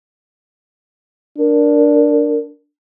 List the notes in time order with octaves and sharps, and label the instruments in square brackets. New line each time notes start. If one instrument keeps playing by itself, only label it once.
[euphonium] D4 [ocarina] A#4